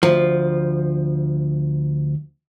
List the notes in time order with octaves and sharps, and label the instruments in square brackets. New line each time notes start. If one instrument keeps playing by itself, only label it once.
[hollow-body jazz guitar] D2 F3